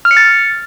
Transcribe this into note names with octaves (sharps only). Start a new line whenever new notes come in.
F6
C#7
A6